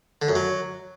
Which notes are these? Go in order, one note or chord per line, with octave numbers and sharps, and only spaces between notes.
D3
F#2
F#3